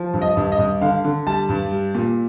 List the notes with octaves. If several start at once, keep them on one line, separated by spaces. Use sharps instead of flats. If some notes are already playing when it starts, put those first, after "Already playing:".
Already playing: F3
G2
D#5
G2
D#5
G2
D3 F5
D3
G3 A5
G2
G3
A#2